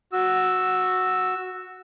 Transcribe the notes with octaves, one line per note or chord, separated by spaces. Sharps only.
F#4 E6